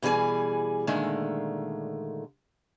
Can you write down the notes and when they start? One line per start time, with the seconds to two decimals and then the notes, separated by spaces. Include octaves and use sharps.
0.02 B2 E3 G3 G#4 G#5
0.87 A#2 D3 D#3 G#3 A3